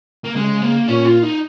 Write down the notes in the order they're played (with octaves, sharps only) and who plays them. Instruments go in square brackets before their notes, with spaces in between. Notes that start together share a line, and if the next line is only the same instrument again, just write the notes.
[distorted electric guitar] A#3
[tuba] C#3 [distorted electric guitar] G#3
[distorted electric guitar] A#3
[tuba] A#2 [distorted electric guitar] C#4
[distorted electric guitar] F4
D#4